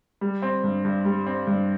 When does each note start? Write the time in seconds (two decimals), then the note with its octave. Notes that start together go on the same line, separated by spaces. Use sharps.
0.21 G3
0.42 C4
0.64 G2
0.85 G2
1.05 G3
1.27 C4
1.47 G2